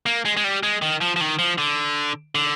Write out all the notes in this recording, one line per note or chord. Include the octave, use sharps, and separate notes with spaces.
A#3
G#3
G#3
G3
G#3
D#3
F3
F3
D#3
F3
D3
D3